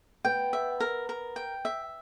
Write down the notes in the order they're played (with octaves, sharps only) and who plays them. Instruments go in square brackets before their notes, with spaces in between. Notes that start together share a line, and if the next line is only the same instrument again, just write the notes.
[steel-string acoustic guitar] B3 [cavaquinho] G5
[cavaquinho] E5
A#4
A#4
G5
E5